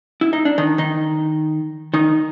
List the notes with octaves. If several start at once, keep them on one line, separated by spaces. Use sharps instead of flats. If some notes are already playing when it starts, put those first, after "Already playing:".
E4
D#4
D4
D#3 D#4
D#3 D#4
D#3 D#4